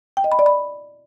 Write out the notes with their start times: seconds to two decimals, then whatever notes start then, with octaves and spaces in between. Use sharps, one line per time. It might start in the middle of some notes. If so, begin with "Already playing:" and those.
0.17 G5
0.24 D#5
0.32 B5
0.39 D5
0.46 B5